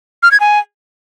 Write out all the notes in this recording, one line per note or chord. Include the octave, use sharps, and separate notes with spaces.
F6
G#6
G#5